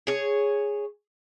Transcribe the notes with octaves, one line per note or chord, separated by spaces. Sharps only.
G#4 C#5